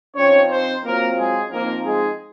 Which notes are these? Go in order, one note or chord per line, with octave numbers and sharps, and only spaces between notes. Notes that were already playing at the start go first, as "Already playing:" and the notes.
F3 C4 C#4 D#4 C#5
C4 C5
F#3 A#3 C4 F4 A#4
G#3 G#4
F3 A#3 C4 D#4 A#4
G#3 G#4